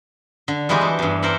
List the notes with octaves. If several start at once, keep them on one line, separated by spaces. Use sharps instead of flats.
D3
E3 G3 G#3 B3 F#4 G4
A4 C5 A5
E2 G2
A4 A#4 C5 D5 E5 F#5